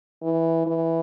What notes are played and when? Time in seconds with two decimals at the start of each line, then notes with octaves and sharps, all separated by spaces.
0.22 E3
0.66 E3